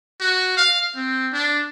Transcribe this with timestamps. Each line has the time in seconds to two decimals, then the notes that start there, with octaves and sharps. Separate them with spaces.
0.21 F#4
0.57 F5
0.96 C4
1.33 D4